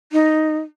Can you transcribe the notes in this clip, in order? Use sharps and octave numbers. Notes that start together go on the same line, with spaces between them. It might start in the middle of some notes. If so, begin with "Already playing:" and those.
D#4